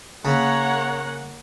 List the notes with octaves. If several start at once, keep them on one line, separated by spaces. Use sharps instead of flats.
C#3 A#3 C#5 F#5 A#5 B5